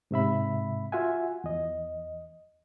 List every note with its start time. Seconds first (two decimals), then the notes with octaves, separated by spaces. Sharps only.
0.11 G#2 C3 E5 B5
0.92 F4 F#4 E5 F#5 G#5
1.44 E2 D#5